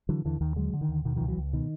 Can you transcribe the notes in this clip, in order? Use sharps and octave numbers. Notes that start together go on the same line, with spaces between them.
D3 E3 F#3
D#2 D3 E3
D#2 D#3
D3 F#3 G#3
D3
D#3
D#2
B2 D#3
D#3 F3
C#2
E3 F#3
C#2
B2 D#3